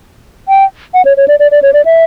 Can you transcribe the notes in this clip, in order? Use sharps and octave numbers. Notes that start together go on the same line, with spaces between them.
G5
F#5
C#5
C#5
D5
D5
D5
C#5
D5
E5